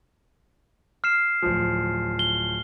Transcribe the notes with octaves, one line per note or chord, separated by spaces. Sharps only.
F6 C7 E7
D1 F3
G7